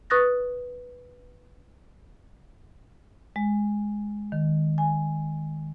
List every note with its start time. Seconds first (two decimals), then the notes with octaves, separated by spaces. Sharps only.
0.10 B4 C#6 D#6 F#6 A6 A#6
3.36 G#3
4.32 D#3
4.78 G#5